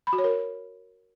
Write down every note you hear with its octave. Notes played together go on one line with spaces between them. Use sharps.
B5
F#4
C#5
A#4